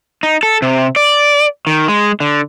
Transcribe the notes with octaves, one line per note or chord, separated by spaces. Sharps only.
D#4
A4
C3
D5
D#3
G#3
D3